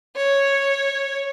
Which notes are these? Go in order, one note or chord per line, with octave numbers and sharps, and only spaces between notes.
C#5